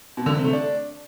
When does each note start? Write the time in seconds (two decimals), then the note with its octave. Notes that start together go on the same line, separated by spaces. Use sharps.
0.17 B2
0.26 D3
0.35 C3
0.44 A3
0.53 D4